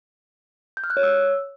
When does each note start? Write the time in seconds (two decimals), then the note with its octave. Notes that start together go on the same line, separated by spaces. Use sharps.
0.77 G6
0.84 F6
0.90 F#6
0.97 C#5
1.03 E6